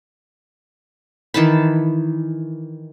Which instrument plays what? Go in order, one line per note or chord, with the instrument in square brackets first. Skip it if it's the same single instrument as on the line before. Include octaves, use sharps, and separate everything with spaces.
[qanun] D#3 E3 A5 B5